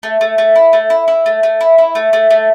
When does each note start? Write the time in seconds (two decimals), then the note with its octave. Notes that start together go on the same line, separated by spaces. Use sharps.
0.03 A3
0.21 A3
0.38 A3
0.56 E4
0.73 A3
0.90 E4
1.08 E4
1.26 A3
1.43 A3
1.61 E4
1.78 E4
1.95 A3
2.13 A3
2.31 A3